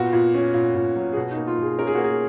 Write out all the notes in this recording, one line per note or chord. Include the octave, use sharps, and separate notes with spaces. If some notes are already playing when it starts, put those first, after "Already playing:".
Already playing: A#2 B3 F#4
A#2
C#4
A#2
A#2
F#3
G#4
B2 F#4
D#4
A#3
F4
B2 G#4
C#4 A#4
G#4
A#3 F#4
G#4